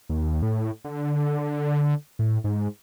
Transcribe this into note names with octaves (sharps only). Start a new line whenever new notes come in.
D#2
A2
D3
A2
G#2